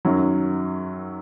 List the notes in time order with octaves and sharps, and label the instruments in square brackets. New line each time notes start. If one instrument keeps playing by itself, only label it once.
[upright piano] F#2 D#3 F#3